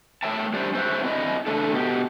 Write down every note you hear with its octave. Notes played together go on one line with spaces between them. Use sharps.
A3 C#5 E5 G5 A5
G3 C#4 D4 C5 D5
C#4 C5 C#5 D#5 E5 F#5
A3 C4 E4 D5 D#5
C#3 A3 D4 A4
B2 G4